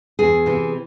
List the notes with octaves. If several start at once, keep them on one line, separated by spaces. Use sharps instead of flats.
E2 G#4
C3 E3